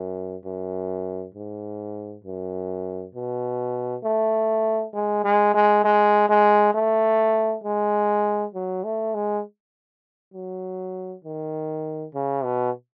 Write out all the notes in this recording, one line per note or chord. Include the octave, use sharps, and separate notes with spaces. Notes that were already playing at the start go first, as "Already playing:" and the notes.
Already playing: F#2
F#2
G#2
F#2
B2
A3
G#3
G#3
G#3
G#3
G#3
A3
G#3
F#3
A3
G#3
F#3
D#3
C#3
B2